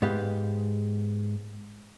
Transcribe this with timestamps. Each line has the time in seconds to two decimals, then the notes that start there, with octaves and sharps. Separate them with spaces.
0.02 G#2 G#3 B3 G4 F5